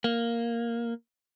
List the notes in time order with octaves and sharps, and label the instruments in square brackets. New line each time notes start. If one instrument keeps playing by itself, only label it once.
[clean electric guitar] A#3